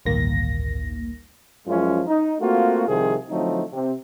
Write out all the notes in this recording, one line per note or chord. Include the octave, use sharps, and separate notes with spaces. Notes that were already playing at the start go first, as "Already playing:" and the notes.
A1 D2 G2 D#3 A#3 A#6
F#2 F3 G#3 C#4 E4 F4
D#4
A3 A#3 C4 F4 F#4
C2 C3 D#3 F3 C4 G#4
D3 F3 F#3 A3 C4 D#4
C3 C4